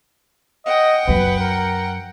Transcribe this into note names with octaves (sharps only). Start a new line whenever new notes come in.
D#5 F#5 G5
F#2 F#3 B4
A#4